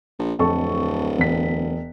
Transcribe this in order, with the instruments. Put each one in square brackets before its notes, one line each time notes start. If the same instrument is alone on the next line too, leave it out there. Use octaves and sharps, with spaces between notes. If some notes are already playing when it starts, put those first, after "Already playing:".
[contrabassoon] A#1
[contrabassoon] D1 [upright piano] F2 A4 C#6
[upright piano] E1 B6